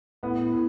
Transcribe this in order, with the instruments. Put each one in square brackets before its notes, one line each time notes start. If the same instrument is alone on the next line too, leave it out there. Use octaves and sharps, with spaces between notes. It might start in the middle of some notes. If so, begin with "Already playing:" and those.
[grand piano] A2 B3
A2